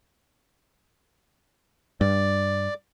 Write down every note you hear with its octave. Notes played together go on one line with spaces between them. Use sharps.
G2 D5